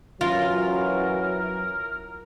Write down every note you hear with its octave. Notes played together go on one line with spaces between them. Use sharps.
F#2 E3 F#3 F4 A#4